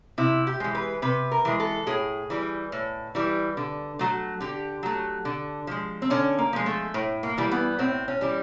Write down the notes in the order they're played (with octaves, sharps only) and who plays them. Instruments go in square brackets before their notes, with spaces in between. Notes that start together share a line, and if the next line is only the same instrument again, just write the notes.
[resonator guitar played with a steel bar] C3 E4
G4
E3 G#3
B4
C3 B4
A#4
E3 G#3
A4
A2 G#4
E3 G3
A2
E3 G3
D3
F#3 A3
D3 G4
F#3 A3
D3
F3 G#3
C4
D3 C#4
A#3
F3 G#3
A3
A2
A#3
E3 G3
B3
A2 C4
C#4
E3 G3